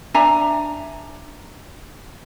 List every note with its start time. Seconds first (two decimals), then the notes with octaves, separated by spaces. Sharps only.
0.14 D4 E5 G#5 A#5